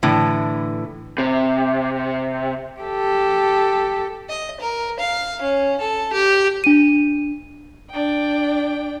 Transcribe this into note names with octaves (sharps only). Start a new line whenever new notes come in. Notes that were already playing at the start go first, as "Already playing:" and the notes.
A2 D3 E3
C3
G4 A4
D#5
A#4
F5
C#4
A4
G4
D4 D#7
D4 G5